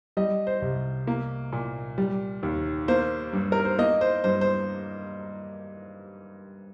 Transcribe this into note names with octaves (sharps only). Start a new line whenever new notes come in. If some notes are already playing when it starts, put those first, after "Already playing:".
G3 D#5
C5
C2
A#3
A#2
G3
D#2
A#3 C5
G2
A#4
C5
A#3 D#5
C5
G2 C5
C5